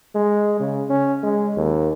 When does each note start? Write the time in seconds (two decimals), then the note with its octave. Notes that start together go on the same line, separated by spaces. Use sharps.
0.15 G#3
0.60 C#3
0.90 C#4
1.23 G#3
1.57 D#2